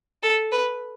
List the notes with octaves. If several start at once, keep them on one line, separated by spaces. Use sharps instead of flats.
A4
B4